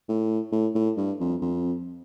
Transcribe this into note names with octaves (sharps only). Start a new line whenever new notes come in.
A2
A2
A2
G2
F2
F2